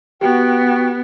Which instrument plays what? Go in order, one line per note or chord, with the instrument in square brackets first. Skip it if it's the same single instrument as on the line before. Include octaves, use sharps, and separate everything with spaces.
[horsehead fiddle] B3 [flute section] F#4 G5 [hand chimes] G4